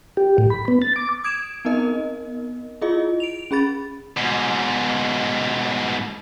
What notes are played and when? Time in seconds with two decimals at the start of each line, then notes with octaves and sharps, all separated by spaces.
0.17 G4
0.38 A2
0.50 B5
0.68 B3
0.82 A6
0.96 D6
1.24 D#6 G#6 D7 E7
1.65 B3 C4 D#4 A#4 D#5
2.81 E4 F4 G#4 D#5
3.20 D7 F7
3.51 C#4 G#4 B5 A6
4.18 G#2 B2